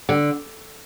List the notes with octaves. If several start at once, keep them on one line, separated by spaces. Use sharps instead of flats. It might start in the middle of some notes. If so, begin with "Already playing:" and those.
D3